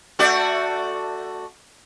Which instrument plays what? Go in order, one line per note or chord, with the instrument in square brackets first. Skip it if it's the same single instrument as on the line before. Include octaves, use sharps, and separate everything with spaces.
[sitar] A3 F#4 D5